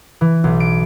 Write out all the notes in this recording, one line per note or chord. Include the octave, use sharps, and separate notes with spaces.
E3
B1
D7